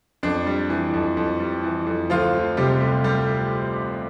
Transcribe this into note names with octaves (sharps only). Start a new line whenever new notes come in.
F2 D4
G3
E3
F2
F2
G3
E3
F2
D2 F3 F4
F3
C3 G3 G4
D2
D2 G3 G4